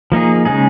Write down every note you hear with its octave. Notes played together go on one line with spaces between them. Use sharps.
F3 A#3 D#4 G#4
C#3 G#3 D#4 G#4